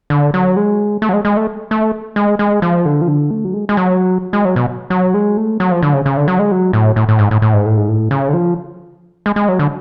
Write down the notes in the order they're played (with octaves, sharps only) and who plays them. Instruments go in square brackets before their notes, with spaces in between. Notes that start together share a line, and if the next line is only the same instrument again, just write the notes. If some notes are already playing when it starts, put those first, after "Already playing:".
[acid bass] D3
F#3
G#3
A3
F#3
G#3
G#3
A3
A3
G#3
G#3
F3
D3
F3
D3
A3
F#3
G#3
G#3
F#3
G#3
F#3
B2
F#3
G#3
A3
F#3
F3
D3
C#3
C#3
D3
F#3
G#3
F#3
A2
A2
A2
G#2
A2
A2
G#2
A2
G#2
A2
C#3
D3
F3
G#3
G#3
F#3
D3